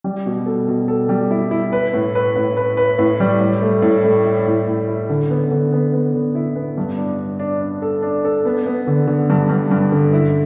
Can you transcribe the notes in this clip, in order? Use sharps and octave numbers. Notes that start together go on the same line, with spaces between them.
G3
B2
A4
B2
A4
G3
E4
E4
B4
A2
B4
A2
B4
B4
A2
G3
A2
A3
A2
A3
E4
A2
A2
E4
D3
B3
D3
B3
B3
D3
E4
B3
G2
D4
D4
D4
D4
A4
D4
A4
B3
B3
D3
D3
G2
G2
G2
D3
E4